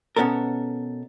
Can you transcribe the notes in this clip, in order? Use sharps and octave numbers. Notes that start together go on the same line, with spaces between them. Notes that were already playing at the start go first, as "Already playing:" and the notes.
B2 B3 C#4 A4 A#4